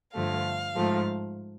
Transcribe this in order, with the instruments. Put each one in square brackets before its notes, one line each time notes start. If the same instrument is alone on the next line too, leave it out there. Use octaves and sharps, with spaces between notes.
[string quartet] G2 D3 F3 A3 F5
G#2 F3 A3